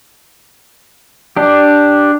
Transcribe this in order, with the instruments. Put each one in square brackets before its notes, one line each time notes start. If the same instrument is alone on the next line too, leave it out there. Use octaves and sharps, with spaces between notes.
[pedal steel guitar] D4 G4